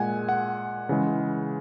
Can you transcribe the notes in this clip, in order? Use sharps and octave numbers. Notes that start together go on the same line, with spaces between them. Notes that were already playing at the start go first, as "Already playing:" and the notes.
Already playing: A#2 G#3 F#5 G#5
F#5
C#3 E3 G#3